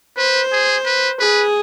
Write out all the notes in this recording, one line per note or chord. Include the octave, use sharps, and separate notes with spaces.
B4 C5
G#4
B4
G#4 B4